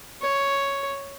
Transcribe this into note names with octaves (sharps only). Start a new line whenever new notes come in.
C#5